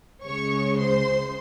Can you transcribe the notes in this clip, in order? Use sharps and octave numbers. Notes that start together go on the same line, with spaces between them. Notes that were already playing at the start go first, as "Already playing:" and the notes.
C#2 C#3 G#3 C#5 C#6
C5 C6